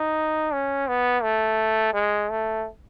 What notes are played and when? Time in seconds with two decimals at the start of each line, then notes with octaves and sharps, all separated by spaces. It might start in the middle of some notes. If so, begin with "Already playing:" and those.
Already playing: D#4
0.53 C#4
0.88 B3
1.23 A3
1.93 G#3
2.30 A3